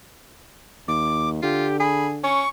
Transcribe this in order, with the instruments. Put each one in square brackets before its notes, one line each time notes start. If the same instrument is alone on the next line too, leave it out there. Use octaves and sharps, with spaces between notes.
[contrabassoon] D#2 [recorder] D6
[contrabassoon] D3 [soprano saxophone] F4 [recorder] G4
[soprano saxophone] G#4 [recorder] B5
[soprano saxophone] C#4 [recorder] C#6